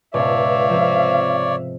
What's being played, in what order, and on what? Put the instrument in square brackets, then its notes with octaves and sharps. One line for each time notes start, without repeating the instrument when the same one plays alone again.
[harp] C#2 G#2 B2 [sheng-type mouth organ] C#5 D5 [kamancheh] E5 F5
[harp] C3 F3